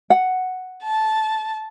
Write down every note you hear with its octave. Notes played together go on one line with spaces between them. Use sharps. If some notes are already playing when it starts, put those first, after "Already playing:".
F#5
A5